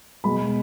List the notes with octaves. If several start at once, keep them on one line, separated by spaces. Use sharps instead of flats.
B2 G#3 B5